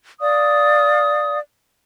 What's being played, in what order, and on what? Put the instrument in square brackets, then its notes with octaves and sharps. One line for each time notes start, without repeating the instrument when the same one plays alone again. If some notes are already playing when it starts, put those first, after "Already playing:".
[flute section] D5 F5 D#6